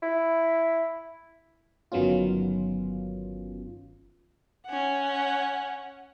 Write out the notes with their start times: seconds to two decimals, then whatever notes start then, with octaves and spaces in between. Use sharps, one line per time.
0.02 E4
1.92 G1 D#3 F#3 B3 C#4 F4
4.66 C#4 F#5